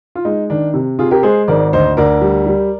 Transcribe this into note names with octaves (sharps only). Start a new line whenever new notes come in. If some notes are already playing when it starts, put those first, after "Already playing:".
F4
G#3 D#4
D#3 D4
C3
C3 F4 G#4
G4 A#4
G#3 G#4 C5
G#1 A#4 D5
D2 C5 D#5
D2 A#4 D5
G3
G3